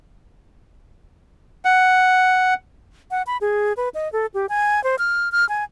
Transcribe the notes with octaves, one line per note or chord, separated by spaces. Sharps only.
F#5
F#5
B5
G#4
B4
D#5
A4
G4
G#5
C5
F6
F6
G#5